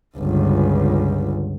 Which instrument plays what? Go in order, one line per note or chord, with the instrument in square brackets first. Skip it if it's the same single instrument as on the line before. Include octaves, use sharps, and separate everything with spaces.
[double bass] G1 C#2